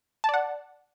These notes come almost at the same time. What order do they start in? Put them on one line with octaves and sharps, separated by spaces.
A5 D5 F#5